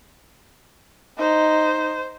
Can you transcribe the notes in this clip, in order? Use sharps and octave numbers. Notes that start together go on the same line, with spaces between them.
D#4 C5